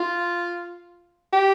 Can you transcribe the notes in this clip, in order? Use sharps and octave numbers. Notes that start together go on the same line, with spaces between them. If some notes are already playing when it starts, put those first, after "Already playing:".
Already playing: F4
G4